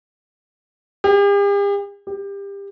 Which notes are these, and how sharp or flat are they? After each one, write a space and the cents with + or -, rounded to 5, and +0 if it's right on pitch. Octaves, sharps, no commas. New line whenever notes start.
G4 +45
G4 +25